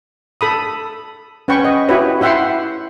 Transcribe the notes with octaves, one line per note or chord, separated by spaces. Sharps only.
A4 B5 D#6
C#4 B4 F#5 G5 C#6
D#5
E4 F#4 G4 B4 C#5
E4 E5 F#5 G5 C6